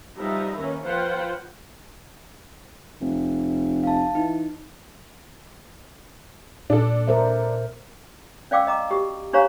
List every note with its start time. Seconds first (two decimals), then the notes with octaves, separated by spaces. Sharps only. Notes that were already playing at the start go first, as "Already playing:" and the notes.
0.17 F3 G3 D#4 B4 E5 A#5
0.56 D#3 A#3 C#4
0.85 F3 F4 B4 C5 F#5 G5
3.01 F1
3.84 F5 A5
4.15 E3 D#4
6.70 A#2 D4 A4
7.07 A#4 C5 E5
8.51 C#4 D5 F5 G5 D6 E6
8.67 D#5 A#5 D6
8.91 F#4 G4
9.33 D4 G4 C5 C#5 F5 A#5